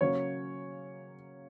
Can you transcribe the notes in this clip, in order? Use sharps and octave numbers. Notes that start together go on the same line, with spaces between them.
C#3 F#3 A#3 C#4 C#5